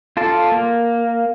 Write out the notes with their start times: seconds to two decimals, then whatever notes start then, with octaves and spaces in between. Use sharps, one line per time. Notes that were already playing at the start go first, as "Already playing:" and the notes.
0.17 F4 A4 D5
0.52 A#3